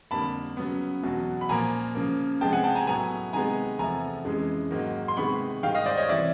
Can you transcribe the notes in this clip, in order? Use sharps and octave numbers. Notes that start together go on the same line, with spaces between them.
F2 D3 G3 A#3 A5 B5
C#3 F#3 B3
E2 B2 F#3
B5
A#2 F3 A#3 G#5 A#5
C#3 F3 A#3
C3 F3 G#3 B3 G5 A5
F#5 G#5
G5 A5
G#5 A#5
A2 F#3 B3 G#5 A#5
C3 D#3 G#3 B3 G#5 A#5
E2 C3 F3 A3 G#5 A#5
F2 C#3 E3 G#3
G#2 D#3 F#3 A#3
C6
C3 D#3 G#3 B3 B5 C#6
G#2 D#3 G3 F5 G5
D#5 F5
C5 D5
C#5 D#5
C3 E3 G3 D5 E5